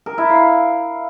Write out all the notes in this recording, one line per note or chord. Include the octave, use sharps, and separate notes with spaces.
A#4
E4
F5